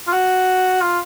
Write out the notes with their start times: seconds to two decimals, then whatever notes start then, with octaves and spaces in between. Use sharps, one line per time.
0.07 F4
0.13 F#4
0.82 F4